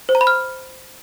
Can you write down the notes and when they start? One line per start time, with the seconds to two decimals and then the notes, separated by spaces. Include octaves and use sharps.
0.09 C5
0.15 A#5
0.21 B5
0.27 F6